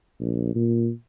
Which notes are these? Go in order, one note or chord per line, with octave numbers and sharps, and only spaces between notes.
A#1
A#2